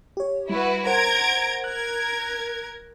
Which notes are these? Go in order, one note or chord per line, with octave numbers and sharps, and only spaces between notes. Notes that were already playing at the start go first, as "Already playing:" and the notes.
G4 C#5
G3 E4 F#4 B4
A#4 C5 F#5 A#5 G#6 D7
A#4 F#6 G#6